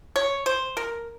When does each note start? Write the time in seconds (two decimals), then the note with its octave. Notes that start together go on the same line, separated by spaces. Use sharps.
0.16 C#5
0.46 C5
0.77 A#4